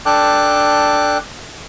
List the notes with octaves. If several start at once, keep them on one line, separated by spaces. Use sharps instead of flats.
D4 A4 G5 D6 F#6